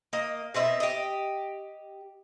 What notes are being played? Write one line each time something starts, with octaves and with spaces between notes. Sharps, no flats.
A#3 D#5
B2 C4 D#5 E5
G4 D#5